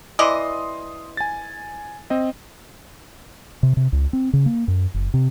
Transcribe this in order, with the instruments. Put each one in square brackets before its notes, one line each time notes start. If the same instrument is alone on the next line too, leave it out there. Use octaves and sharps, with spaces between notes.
[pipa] E3 D5 D#5 [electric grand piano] C6 D#6
[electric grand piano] G#5 A6
C4 D#5
[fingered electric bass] C3
C3
C#2
C4
C#3
A#3
F#2
F#1
C3